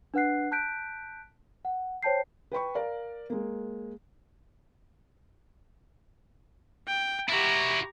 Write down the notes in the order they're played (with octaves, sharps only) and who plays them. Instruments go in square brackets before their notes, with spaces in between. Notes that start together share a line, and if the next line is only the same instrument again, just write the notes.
[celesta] D4 B4 F#5 F#6 C7
A5 F#6 G6 B6 D7
F#5
C5 C#5 G5 A5 G6 C7
[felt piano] B4 G5 B5 C#6
A#4 D5 F5
G#3 A#3
[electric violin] G5
[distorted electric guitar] E4 F#4 [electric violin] G4 A#5